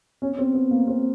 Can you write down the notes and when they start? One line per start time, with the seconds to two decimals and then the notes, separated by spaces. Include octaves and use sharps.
0.22 C#4
0.39 C4
0.54 B3
0.71 A#3
0.87 C4